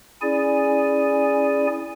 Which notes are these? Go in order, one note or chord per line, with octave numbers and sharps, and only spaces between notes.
C#4 E4 G#4 D5 G#5